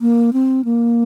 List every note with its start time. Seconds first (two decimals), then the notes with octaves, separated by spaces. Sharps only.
0.01 A#3
0.33 C4
0.65 A#3